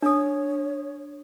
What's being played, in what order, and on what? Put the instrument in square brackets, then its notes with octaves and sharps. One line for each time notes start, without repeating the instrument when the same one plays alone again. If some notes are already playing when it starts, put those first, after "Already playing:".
[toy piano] D4 D#6 [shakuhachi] C#5